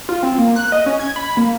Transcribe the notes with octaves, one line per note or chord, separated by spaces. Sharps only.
F4
C4
A#3
F#6
D#5
C#4
G#6
B5
A#3